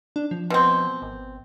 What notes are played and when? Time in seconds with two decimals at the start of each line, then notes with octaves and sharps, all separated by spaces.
0.16 D4
0.31 F3
0.50 B2 C4
1.02 G#1